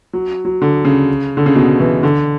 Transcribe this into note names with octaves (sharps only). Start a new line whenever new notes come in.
F#3
F#3
D3
C#3
D3
C#3
B2
E3
D3